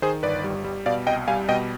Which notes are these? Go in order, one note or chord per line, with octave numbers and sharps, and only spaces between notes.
D#3 G#4 C5
G1 B4 D5
G3
G3
B2 D5 F5
C2 D#5 G5
G3 F5 G#5
B2 D#5 G5